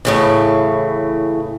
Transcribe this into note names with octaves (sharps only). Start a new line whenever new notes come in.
A2 C#3 E3